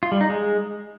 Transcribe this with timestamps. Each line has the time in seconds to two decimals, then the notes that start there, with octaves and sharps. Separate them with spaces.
0.03 F4
0.12 G3
0.21 D#4
0.30 G#3